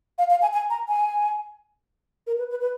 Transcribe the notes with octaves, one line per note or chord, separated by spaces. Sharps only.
F5
F5
G#5
G#5
A#5
G#5
A#4
B4
B4
B4